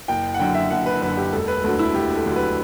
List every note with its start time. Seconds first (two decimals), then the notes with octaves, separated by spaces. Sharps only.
0.08 F#1 G5
0.34 F#5
0.39 F#2 D3 G5
0.55 E5
0.70 F#1 F#5
0.86 B4
1.02 F#2 D3 B4
1.17 G4
1.32 E1 A4
1.48 B4
1.64 D2 D3 F#3 A4
1.79 E4
1.95 E1 G4
2.15 A4
2.26 D2 D3 F#3
2.36 B4